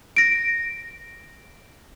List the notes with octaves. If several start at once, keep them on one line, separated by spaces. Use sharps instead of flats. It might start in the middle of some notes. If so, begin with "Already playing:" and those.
A#6 D7